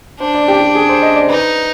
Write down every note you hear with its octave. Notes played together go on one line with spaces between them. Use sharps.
D4 C5
D5
G4
G4
G#4
C5
D#5
D5
C5
D#4 B4